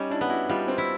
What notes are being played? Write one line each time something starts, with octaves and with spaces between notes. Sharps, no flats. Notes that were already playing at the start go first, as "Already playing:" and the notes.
Already playing: G3 C#4 D#4
D4 E4
B3
E4 F#4
G3 D#4 F4
C4
E4